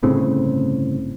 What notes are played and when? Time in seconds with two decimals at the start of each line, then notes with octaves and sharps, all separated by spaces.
0.03 G1 A2 C#3 C4